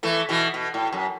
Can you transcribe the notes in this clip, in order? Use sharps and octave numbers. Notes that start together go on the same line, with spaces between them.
E3 A3
B2 E3
B2
A2
F#2